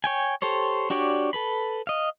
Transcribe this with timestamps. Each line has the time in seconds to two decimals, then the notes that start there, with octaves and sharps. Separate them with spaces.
0.04 C#5 G5 G#5
0.42 G4 A4 C5 C#5
0.90 D4 F#4 G4 C#5 D5
1.33 A4 B4 B5
1.87 D#5 F5